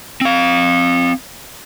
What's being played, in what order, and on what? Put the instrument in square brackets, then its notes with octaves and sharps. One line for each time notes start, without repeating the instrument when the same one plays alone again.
[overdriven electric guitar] C4 F5